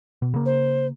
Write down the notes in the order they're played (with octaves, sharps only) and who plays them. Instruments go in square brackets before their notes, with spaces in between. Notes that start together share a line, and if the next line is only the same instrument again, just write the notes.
[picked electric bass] B2
C#3 A#3
[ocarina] C5